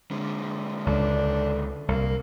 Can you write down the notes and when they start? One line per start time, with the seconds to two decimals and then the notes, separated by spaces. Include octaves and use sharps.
0.11 D3 G#3
0.86 C#2 A3 D4
1.88 C2 A#3